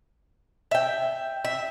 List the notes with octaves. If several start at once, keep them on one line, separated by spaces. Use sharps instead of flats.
E5 G5
E5